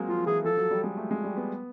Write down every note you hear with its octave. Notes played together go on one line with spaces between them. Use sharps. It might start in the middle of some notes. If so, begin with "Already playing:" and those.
Already playing: F#3 G#3 A#3 C4
F3 F4
E3 G#4
F3 A4
F#3
G3
G#3
A3
G#3
G3
B3